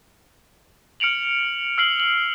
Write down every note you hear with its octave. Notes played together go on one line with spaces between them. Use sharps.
F6 C#7 D7 F7 F#7
E6 F6 C7 F#7
F#7